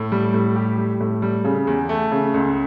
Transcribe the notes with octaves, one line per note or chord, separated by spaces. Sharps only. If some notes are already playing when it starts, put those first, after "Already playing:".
Already playing: A2
G3
A2
G4
G3
A2
G3
C#3
E2
A3
C#3
C#2